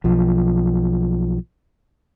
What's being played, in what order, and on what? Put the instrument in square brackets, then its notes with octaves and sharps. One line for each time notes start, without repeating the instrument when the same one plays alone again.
[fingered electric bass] B1 F3